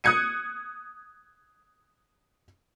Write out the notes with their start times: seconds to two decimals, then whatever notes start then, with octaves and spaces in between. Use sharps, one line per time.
0.04 D#6 F#6 G#6 C#7 D#7